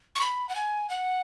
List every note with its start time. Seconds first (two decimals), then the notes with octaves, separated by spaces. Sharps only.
0.15 C#6
0.21 B5
0.49 F#5
0.55 G#5
0.90 F#5